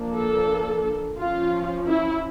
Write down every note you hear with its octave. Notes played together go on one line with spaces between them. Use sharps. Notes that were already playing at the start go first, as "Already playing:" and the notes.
Already playing: F3 A#3 D4
A4
F3 C#4 F4
E4